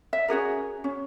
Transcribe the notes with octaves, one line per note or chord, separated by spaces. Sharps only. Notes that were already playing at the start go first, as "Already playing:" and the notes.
E5
C#4 F#4 G#4 A#4
C#4